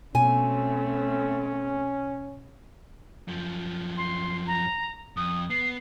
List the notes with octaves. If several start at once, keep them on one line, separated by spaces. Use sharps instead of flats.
B2 A3 C4 C#4 G#5
F#2 F3
C6
A#5
F2 D#6
B3 C7